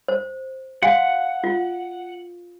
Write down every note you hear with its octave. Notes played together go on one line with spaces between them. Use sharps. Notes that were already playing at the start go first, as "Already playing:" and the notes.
C5
F#4 F5 F#5 G#5
F4